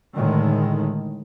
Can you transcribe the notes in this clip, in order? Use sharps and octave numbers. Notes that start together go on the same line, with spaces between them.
A2 D3 D#3 G#3